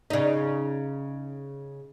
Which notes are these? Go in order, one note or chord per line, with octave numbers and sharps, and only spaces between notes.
C#3 D#4